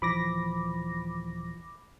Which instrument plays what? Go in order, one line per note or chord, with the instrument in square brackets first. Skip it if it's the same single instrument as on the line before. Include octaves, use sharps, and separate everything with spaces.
[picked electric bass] D#1 E3 F3 [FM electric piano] B5 D6 A#6